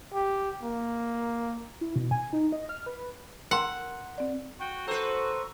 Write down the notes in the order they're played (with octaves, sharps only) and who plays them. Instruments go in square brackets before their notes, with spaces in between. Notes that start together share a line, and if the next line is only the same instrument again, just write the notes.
[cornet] G4
A#3
[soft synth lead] E4
B2
G#5
D#4
D#5
F6
B4
[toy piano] A#4 A#5 C6 [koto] F#5 [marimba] G5
[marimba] C4 D5
[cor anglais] F#4 [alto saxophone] G5
[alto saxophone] A4 [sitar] B4 C5 [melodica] A#5 C#6 E6